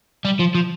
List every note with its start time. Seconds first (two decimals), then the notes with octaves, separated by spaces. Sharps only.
0.25 G3
0.39 F3
0.55 F3